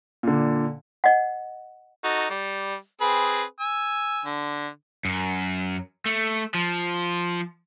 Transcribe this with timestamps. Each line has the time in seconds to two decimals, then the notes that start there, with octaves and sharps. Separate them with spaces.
0.23 A#2 D3
1.04 D#5 F#5
2.04 D#4 F#4 A4
2.30 G3
3.01 C4 G#4 B4
3.60 G#5 E6
4.25 D3
5.05 F#2
6.06 A3
6.55 F3